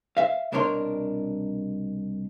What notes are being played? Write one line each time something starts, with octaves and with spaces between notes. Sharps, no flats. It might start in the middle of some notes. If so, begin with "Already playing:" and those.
E5 F5
C2 B2 D4 A#4 C#5 C6